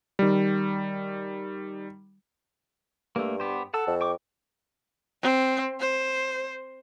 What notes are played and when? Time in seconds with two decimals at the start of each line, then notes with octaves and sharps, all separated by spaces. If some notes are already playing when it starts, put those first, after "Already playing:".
0.19 D#3 G3
3.16 G2 A3 A#3
3.40 B3 G4 C5
3.74 A4 F#5 A5 E6
3.87 F2
4.01 G5 C#6 D6
5.22 C4
5.80 C5